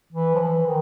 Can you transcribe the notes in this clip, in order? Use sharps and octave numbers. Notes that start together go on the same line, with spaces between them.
E3
F3
E3
D#3